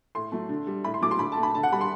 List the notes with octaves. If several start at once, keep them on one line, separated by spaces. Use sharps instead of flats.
A2 C6
F#3 A3
D3
G3
A2 B5
C6
F#3 A3 D6
C6
D3 B5
A5
A3
B5
D3 A5
F#5
G3 B5
C6